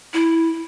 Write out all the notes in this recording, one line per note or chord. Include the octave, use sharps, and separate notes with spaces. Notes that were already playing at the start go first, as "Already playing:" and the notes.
E4